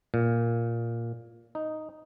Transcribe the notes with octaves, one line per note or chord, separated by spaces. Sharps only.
A#2
D#4